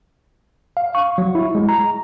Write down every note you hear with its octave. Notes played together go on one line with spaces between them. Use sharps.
F5
C#6
F#3
E4
G#3
A#5